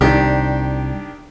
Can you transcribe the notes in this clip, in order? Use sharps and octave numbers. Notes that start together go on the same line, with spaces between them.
C2 D#3 D4 G4